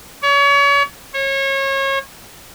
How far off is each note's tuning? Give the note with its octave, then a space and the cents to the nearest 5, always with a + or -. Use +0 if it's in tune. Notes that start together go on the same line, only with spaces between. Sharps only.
C#5 +35
C#5 -30